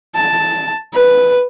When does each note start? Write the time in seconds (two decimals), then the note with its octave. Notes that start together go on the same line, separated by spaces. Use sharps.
0.16 A5
0.94 B4